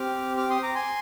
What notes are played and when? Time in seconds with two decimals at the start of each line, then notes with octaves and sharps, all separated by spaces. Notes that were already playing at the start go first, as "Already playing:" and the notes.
Already playing: C4 G4 D6 F6
0.37 D6 F6
0.50 C6 D#6
0.63 A#5 D6
0.75 G#5 C6